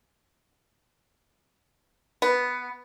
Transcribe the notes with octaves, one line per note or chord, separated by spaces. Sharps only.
B3